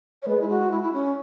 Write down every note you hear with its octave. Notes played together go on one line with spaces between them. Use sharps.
C#5
G#3 B4
E4
F#4
E4
E4
C#4